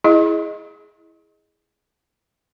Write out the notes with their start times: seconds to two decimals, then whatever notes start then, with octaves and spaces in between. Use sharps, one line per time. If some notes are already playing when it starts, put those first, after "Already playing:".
0.04 E4 G#4 D#5